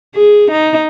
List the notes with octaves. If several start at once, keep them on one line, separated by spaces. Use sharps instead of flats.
G#4
D#4